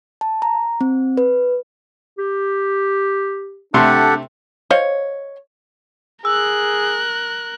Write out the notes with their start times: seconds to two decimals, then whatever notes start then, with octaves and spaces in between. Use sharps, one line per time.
0.21 A5
0.42 A#5
0.81 C4
1.17 B4
2.19 G4
3.74 C3 A3 D4 G4 A4 F#5 C6
4.71 C5 C#5 D#5 F5
6.25 G#4 A#4 E6 F#6